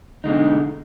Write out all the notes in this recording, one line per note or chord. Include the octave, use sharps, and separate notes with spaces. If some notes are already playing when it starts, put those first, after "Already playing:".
B2 D3 G#3 D#4